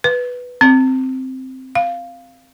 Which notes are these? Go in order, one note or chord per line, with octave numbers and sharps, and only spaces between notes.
B4
C4
F5